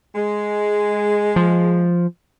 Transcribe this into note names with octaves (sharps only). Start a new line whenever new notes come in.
G#3
F3